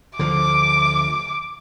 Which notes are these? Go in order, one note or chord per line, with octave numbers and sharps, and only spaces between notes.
D2 D3 F3 D6